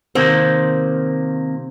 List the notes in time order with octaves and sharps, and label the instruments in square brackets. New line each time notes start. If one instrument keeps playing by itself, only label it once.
[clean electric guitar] C3 D#3 A#3 [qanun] C4